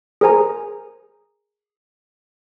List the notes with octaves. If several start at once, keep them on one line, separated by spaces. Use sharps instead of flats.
G#4 A#4 C5 G#5 A#5